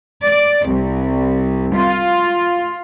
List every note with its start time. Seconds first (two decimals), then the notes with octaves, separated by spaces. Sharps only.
0.24 D5
0.68 C2
1.75 F4